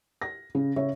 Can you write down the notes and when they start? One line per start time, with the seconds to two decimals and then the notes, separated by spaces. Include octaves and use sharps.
0.22 A#6
0.55 C#3
0.76 C#3 C#5 E5